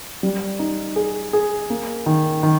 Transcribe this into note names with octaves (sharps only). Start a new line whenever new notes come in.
G3
D#4
G#4
G#4
A#3
D#3
D#3